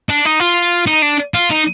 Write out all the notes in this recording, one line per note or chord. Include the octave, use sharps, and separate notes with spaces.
D4
D#4
F4
D#4
D4
F4
D#4